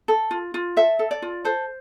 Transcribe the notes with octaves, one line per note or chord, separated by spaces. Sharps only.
A4
F4
F4
A4 E5
A4
D5
F4
A4 C5